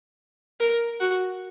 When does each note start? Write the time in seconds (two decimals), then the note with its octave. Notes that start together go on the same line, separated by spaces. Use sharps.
0.60 A#4
1.00 F#4